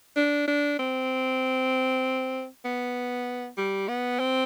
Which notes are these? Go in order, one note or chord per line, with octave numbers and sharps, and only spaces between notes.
D4
D4
C4
B3
G3
B3
C4